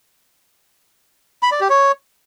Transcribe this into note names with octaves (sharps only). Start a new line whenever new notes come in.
B5
D5
G4
C#5